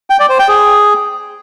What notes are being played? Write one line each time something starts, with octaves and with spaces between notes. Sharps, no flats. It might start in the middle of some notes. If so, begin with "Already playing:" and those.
G5
D5
C5
G5
G#4